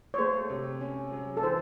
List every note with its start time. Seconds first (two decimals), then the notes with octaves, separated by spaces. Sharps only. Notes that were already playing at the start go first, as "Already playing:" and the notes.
0.14 C#5
0.18 A3 C5
0.50 C3
0.81 C#4
1.12 F#3
1.37 A4
1.43 E3 C5